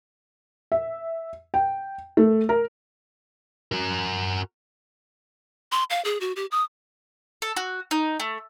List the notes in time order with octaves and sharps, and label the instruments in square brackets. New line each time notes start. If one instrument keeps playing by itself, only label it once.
[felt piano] E5
G5
A3
A#4
[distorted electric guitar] F#4 A#4
[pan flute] C6
F5
G#4
F#4
G4
D#6
[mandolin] A4
F#4
D#4
A3